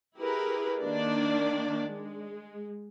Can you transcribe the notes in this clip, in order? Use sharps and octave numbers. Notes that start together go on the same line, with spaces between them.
E4 G4 G#4 A#4 B4
D#3 A#3 D4 D5
G#3